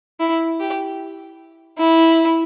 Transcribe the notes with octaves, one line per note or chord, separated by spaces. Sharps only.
E4
G4
E4